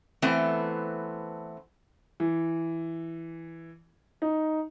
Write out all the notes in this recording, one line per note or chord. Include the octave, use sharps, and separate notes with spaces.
E3 A3 B3 C4
E3
D#4